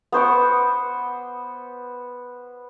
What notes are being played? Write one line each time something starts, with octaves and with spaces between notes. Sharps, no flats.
B3 C5 C#6 D6